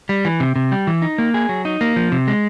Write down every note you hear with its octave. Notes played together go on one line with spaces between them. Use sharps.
G3
E3
C3
C3
G3
E3
D#4
A#3
G#4
F#3
D#4
A#3
F3
C3
G#3